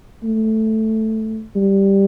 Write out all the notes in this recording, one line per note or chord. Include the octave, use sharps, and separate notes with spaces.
A3
G3